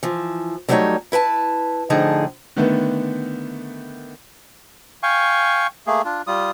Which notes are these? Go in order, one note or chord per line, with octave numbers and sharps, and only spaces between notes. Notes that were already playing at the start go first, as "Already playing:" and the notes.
E3 F3
D3 F#3 G3 A3 D#4 C#5
E4 B4 G5 A5
A2 D3 F3 D#4 G#4
D3 D#3 A3 B3
F5 G5 G#5 C#6
A3 A#3 G#4
D4 F4
G3 F4 D#6